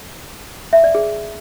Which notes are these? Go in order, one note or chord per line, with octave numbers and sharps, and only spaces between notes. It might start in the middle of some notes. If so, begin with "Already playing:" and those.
E5
D5
G#4